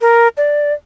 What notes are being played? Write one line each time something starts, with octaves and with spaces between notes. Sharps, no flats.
A#4
D5